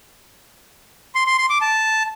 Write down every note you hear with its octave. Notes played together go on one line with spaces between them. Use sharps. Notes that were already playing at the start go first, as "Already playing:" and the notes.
C6
C6
C6
D6
A5